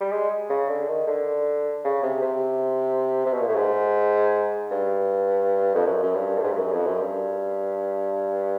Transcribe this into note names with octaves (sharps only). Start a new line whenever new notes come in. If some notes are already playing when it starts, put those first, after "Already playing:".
G3
G#3
C#3
D3
D#3
D3
C#3
C3
C3
C3
B2
A#2
A2
G#2
G2
F2
F#2
F#2
G2
A2
G#2
G2
F#2
F2
F#2
G2